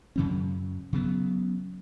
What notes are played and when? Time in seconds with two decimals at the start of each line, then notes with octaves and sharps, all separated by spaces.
0.16 F#2 C#3 F#3 C#4
0.93 C#3 F#3 B3